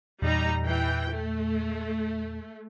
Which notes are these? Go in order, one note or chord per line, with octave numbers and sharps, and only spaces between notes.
E2 A#2 G3 D#4 A#5
E3 G5
A3